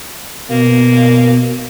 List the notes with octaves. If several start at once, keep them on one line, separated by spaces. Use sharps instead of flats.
B2 A#3